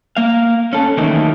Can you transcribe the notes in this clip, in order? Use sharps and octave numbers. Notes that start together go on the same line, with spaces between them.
A#3 F5
C#4 A4
D#3 E3 F#3 A3 A#3 D#4